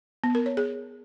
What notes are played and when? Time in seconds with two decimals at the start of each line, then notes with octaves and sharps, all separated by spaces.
0.24 B3
0.35 A#4
0.46 C#5
0.57 G#4